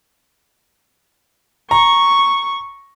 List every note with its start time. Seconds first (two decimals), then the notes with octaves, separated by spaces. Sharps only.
1.71 A#5 C#6